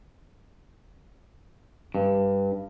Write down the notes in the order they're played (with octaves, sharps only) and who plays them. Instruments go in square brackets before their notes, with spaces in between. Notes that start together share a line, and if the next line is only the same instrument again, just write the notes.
[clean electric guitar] G2